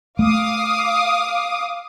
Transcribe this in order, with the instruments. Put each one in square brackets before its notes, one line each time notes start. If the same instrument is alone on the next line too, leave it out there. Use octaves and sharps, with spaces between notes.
[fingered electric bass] A3 [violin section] F5 D6 D#6